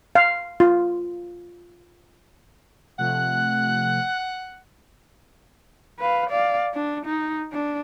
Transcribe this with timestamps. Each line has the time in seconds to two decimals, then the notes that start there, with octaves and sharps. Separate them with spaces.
0.15 F5
0.60 F4
2.99 C3 F3 A3 F#5 F#6
5.99 B4 F5
6.30 D5 F5
6.74 D4
7.05 D#4
7.52 D4